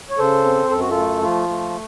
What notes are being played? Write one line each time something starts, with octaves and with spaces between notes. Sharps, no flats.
C#5
C#3 A4 C5
C4
F#2 A4
F#4
F4 A4
A3
F3 F4
A3